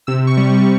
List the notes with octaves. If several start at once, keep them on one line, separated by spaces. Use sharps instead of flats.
C3 E6
C#6
G3
C#6